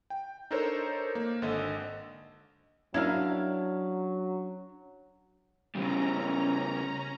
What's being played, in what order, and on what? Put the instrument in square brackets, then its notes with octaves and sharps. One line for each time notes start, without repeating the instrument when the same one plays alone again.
[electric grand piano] G5
D4 D#4 A4 A#4 C5 C#5
A#3
G#1 D3 A4 D#5
[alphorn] F#3 [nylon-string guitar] C#4 D4 [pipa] E4 A#4 F5
[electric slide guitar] C#3 G3 [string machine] C#4 A#5